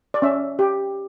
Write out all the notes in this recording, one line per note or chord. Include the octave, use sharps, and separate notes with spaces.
D5
C#4 E5
G4